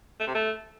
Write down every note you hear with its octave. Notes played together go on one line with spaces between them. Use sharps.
A3
C3
A3